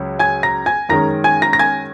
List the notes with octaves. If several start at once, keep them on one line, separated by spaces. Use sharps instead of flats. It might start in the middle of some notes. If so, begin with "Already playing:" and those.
Already playing: C#2 C#3 F#3
G#5 G#6
A#5 A#6
G#5 G#6
F#2 D#3 G#3 C#4 A#5 A#6
G#5 G#6
A#5 A#6
A#6
G#5 G#6